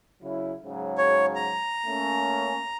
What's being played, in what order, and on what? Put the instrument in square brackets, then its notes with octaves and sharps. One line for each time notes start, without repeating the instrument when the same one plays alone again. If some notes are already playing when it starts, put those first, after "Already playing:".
[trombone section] C#3 F#3 E4
G#2 C#3 F#3
[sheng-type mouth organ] C#5
A#5
[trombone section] A3 A#3 C#4